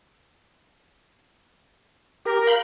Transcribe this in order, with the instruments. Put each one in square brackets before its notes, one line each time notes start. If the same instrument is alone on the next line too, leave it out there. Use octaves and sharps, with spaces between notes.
[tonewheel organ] G4 [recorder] A#4
[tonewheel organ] F5 B5 G6